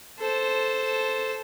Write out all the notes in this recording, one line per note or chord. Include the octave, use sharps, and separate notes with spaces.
A4 C5